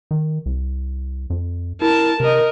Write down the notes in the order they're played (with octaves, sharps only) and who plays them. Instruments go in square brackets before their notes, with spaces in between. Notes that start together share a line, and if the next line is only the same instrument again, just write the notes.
[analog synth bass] D#3
C2
F2
[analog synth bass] E4 [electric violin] A#4 A5
[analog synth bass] C3 [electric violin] A#4 D#5